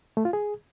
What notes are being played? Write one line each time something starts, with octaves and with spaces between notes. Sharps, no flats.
A3
F4
G#4